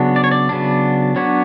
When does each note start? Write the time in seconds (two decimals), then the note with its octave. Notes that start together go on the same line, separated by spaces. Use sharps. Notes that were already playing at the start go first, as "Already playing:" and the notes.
Already playing: C#3 F#3 B3 D4
0.16 D5
0.24 C#5
0.31 D5
0.49 C#3 F#3 B3 D4
1.16 F#3 B3 D4 C#5